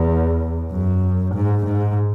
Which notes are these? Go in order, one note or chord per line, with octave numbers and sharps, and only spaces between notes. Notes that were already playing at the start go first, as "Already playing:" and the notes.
Already playing: E2
F#2
G#2
G#2